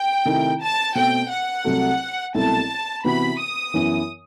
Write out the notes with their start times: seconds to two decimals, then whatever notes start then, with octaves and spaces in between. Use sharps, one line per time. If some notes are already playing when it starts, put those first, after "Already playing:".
Already playing: G5
0.25 C3 D#3 A3 E4
0.61 A5
0.95 B2 A3 C4 G5
1.30 F#5
1.64 C2 C3 F#3 A3
2.34 C2 B2 F#3 A3 E4 A5
3.04 C3 E3 B3 F#4 B5
3.39 D#6
3.74 F#2 E3 B3 E4